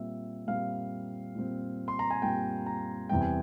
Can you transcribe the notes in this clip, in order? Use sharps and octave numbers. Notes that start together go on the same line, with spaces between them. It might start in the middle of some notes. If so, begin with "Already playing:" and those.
Already playing: A#2 G3 C4 E5
A#2 G3 C4 F5
A#2 G3 C4
C6
A#5
G#5
A#2 G3 C4 G5
A#5
E2 C3 E3 G3 C4 G5
G#5